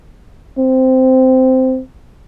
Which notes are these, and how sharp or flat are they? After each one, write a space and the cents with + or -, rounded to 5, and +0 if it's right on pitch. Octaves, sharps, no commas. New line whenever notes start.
C4 -10